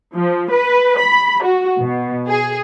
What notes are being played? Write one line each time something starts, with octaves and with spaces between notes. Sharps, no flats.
F3
B4
B5
F#4
B2
G#4